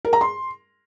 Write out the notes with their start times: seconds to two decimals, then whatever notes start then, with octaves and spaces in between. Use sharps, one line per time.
0.05 A#4
0.13 A#5
0.21 C6